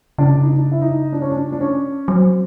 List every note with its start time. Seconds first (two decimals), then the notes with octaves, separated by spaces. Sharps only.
0.18 C#3 D4
0.43 D#4
0.50 D4
0.72 E4
0.82 D#4
1.12 D4
1.22 C#4
1.30 D4
1.52 D4
1.61 C#4
2.08 F#3 C4